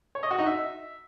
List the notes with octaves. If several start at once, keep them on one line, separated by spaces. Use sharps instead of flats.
C#5
D#5
F#4
D#4
E5